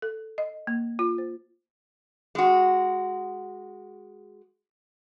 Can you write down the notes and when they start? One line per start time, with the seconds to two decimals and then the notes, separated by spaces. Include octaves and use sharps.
0.02 A4
0.38 D#5
0.67 A#3
0.99 F4
1.18 C5
2.35 G#3 F#4